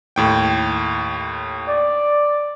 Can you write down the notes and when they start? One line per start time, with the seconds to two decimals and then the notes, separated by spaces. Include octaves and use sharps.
0.16 D#2 A2 G5
1.68 D5